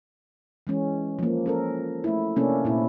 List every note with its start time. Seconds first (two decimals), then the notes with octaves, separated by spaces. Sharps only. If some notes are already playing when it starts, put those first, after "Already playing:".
0.67 E3 G#3 C#4
1.19 F3 A#3
1.46 C#4 A4 A#4
2.04 A3 E4
2.36 C3 A#3 C#4 D4 A4
2.65 A#2 C4 E4